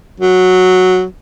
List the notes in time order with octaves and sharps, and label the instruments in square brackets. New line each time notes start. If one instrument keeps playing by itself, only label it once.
[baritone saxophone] F#3